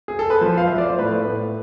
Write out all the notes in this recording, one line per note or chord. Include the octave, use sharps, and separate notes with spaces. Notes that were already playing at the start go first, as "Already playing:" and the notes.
G#4
A4
B4
F3 C5
F5
F3 E5
D5
C5
A2 B4
A2